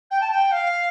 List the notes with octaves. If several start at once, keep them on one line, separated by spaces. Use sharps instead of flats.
G5
A5
G5
F5